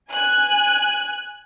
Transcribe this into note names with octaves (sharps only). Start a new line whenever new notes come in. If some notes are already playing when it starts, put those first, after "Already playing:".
G#5 F#6